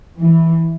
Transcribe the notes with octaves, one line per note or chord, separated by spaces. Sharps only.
E3